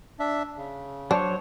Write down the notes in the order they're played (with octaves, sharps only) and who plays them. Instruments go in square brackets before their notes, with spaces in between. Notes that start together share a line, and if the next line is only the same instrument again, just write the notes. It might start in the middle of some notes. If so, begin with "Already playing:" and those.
[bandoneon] D4 E5
C#3
[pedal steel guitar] F#3 C5 C#5 [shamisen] D4